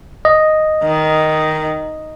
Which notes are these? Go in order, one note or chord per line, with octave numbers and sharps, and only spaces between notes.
D#5
D#3